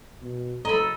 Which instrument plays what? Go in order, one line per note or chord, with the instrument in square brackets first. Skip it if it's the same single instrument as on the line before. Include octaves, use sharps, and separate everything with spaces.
[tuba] B2
[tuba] F#1 [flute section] A4 [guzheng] D#5 B5 [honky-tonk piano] A#5